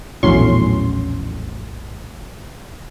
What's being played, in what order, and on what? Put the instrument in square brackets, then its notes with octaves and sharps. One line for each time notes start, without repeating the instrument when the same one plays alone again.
[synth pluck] A#1 E2 A2 F#3 C#4 C6